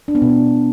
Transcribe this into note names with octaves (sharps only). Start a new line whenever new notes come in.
D4
B3
B2
B3